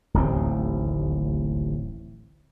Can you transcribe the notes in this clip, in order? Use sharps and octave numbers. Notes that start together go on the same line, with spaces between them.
D1 A1 D#2 C4